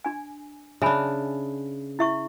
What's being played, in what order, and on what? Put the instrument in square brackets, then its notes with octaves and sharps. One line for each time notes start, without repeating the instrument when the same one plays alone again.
[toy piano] D4 G#5
[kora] C#3 D4 [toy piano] E5 G#5 B5
[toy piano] E4 E5 C#6